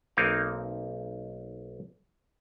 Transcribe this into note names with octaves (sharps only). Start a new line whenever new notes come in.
B1 A#3 C4 D#4 A#4 F5